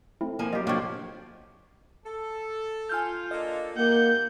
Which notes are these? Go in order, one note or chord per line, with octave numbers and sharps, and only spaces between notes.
A3 C4 E4
F3 A#3 G#5
F#3 F4 G4 D#5
A2 F3 A#3 D4 F4 D5 C#6 G#6
A4
F4 G#5 F6 G6
A#3 D4 A4 D#5
G#2 A#3 G4 F#5 G6